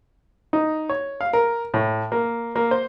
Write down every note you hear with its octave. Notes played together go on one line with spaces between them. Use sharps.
D#4
C#5
F5
A#4
A2
A#3
A#3
C5